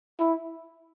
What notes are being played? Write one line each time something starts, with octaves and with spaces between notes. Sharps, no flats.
E4